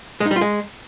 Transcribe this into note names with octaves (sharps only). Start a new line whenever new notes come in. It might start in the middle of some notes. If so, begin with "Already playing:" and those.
G#3
D#4
G3
F4
G#3